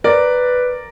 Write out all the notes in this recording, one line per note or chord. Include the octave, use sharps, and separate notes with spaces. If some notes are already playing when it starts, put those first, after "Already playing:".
A#4 B4 D5